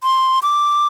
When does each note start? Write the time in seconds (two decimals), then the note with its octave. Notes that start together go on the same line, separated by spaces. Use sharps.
0.03 C6
0.43 D6